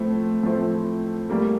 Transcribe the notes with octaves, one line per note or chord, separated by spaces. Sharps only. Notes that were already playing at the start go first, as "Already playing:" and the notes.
Already playing: A2 F3 A3 C4
A2 F3 A3 C4
A2 G3 A#3